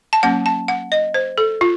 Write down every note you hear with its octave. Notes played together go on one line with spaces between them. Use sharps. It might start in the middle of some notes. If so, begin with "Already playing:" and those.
A5
F#3 A#3 C#4 F#5
A5
F#5
D#5
C5
A4
F4